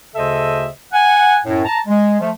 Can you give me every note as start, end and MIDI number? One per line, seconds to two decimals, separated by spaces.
0.15 0.68 38
0.15 0.68 49
0.15 0.68 69
0.15 0.68 72
0.15 0.68 75
0.15 0.68 76
0.92 1.37 78
0.92 1.37 80
1.45 1.62 42
1.45 1.62 45
1.65 1.79 81
1.65 1.79 82
1.87 2.17 56
2.20 2.30 53
2.20 2.30 57